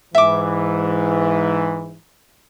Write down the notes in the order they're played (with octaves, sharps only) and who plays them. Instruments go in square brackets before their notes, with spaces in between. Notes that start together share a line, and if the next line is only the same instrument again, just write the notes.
[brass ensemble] G#2 E3 [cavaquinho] E5 D6